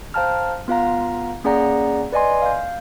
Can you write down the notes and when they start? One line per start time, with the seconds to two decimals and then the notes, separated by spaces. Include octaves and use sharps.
0.14 C5 F5 G5 A5 A#5 F6
0.68 B3 F4 F5 A#5
1.44 A#3 C#4 G#4 D5 F#5 A#5
2.12 B4 D5 D#5 G#5 C6
2.42 F5 G6